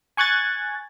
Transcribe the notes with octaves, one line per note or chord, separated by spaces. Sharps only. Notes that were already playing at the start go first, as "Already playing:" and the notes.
G#5 C#6 F#6 G#6 A6